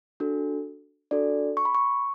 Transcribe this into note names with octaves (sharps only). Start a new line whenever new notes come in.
D4 F#4 A4
D4 F#4 A4 D5
C#6
B5
C#6